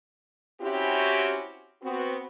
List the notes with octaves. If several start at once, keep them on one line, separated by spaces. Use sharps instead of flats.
C4 C#4 E4 F#4 G4
B3 C4 F#4